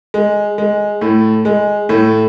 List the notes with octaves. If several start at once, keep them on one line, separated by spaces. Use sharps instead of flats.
G#3
G#3
A2 A3
G#3
A2 A3